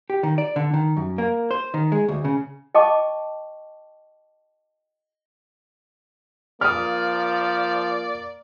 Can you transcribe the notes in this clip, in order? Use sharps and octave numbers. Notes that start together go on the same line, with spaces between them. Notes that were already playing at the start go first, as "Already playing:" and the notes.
G4
D#3
D5
D3
D#3
F#2
A#3
C5
D#3
G#3
D2
C#3
D#5 G5 A5 C#6 D6
F3 A#3 D5 D#6 F6